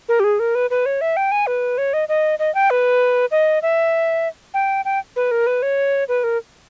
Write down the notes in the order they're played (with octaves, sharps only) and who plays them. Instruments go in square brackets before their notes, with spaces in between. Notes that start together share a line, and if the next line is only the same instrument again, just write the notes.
[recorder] A#4
G4
G#4
A#4
B4
B4
C#5
E5
G5
G#5
B4
C#5
D#5
D#5
D#5
G5
B4
D#5
E5
G5
G5
B4
A#4
B4
C#5
B4
A#4